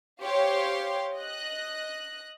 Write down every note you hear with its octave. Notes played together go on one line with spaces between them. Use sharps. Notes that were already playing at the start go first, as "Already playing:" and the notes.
G4 C5 C#5 F5 C6
D#5 F#6